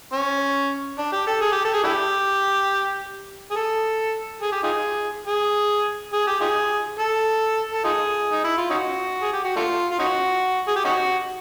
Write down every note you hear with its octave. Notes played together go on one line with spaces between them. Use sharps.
C#4
D4
G4
A4
G#4
G4
A4
G#4
D4 E4 G4
G#4
A4
G#4
G4
D#4 F4 G#4
G#4
G#4
G4
D#4 F4 G#4
A4
A4
D#4 F4 G#4
D#4
E4
F4
C#4 D#4 F#4
G#4
G4
F#4
A3 D4 F4
F4
C#4 D#4 F#4
G#4
G4
C#4 D#4 F#4